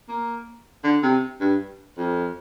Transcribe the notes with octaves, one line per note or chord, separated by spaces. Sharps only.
A#3
D3
C3
G2
F2